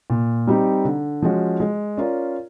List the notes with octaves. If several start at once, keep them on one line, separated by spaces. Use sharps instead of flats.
A#2
G3 C4 D#4 G4
D3
F3 G#3 C#4 F#4
G#3
C#4 F4 A#4 D5